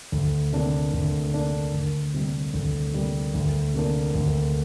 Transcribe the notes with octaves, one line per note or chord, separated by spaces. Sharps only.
D2
C3 A#3 D4
D2
C3 A#3 D4
D2
C3 G3 A#3
D2
C3 G3 A#3
D2
C3 A#3 D4
D2